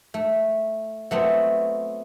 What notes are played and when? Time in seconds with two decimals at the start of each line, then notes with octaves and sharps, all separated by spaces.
0.14 A3
1.11 F#3 A3 B3 C4